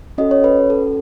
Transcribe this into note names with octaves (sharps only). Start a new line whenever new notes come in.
C#4 F#4 A4 D#5
C#5
B4
A4